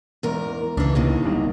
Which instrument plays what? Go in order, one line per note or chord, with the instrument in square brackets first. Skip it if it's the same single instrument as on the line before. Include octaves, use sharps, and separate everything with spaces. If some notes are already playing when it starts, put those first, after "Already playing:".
[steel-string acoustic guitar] E2 G#2 A#4
[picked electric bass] C#2 [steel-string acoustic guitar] E3 D4
[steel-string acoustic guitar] D#2 C3 D#3
[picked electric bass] G3 B3 D4